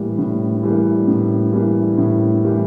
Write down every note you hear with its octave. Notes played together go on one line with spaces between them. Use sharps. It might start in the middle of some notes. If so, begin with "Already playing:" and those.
Already playing: A2 E3 G3 A#3
A2
E3 G3 A#3
A2
E3 G3 A#3
A2
E3 G3 A#3